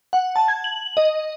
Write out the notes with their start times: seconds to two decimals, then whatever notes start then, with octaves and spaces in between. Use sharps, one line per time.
0.13 F#5
0.36 A5
0.48 G#6
0.64 F#7
0.97 D#5